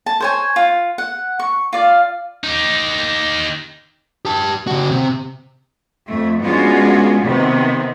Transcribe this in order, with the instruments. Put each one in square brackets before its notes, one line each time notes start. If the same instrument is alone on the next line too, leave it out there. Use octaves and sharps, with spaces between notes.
[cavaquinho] A5
C5 C#5 G#5
F4
F#5
C#6
F4 D5 F5
[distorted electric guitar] D#4 G4
[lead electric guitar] G4 A5
C#3 F#4
C3
[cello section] F2 A3
G#3 B3 C#4 D4 F4 F#4
C3 D#3 B3